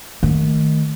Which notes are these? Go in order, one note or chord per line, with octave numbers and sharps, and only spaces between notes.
D#3 A3